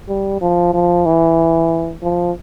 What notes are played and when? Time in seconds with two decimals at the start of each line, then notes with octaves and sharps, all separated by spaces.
0.09 G3
0.41 F3
0.73 F3
1.06 E3
2.02 F3